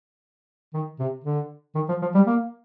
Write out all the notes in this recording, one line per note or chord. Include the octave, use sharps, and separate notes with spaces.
D#3
C3
D3
D#3
F3
F3
G3
A#3